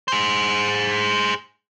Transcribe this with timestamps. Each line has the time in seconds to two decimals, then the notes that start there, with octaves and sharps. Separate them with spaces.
0.08 G#4 C5